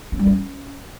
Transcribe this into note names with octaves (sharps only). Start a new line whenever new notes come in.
C#4
G3
C#4